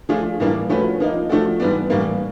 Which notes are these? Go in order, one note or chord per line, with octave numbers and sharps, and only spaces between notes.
F3 A3 D4 F4 G#4
A2 E3 G3 A#3 D4
F3 A3 C#4 F#4 B4
F3 A#3 D#4
F3 A3 D4 F#4 A4
G#2 E3 G3 B3 D4
A2 E3 G3 A#3